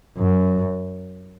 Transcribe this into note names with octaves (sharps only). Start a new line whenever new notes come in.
F#2